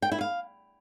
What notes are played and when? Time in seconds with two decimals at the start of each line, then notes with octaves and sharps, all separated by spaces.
0.02 G5
0.12 E4
0.21 F5